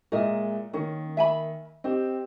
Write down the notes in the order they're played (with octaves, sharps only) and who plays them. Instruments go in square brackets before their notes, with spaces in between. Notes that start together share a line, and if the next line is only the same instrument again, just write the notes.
[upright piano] A#2 G#3 E5 [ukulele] A#4 D#5
[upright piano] D#3 A#3 [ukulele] C#4
[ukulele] E5 G#5 B5
[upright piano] C4 G4 [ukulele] D#5